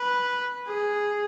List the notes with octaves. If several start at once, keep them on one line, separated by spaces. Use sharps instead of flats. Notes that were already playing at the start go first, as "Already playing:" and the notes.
Already playing: B4
G#4